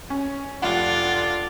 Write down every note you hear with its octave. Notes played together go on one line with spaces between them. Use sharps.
C#4
F1 D4 F4 D5 F#5